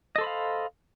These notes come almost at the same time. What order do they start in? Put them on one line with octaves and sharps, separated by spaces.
D#5 A4 C5 B5 F5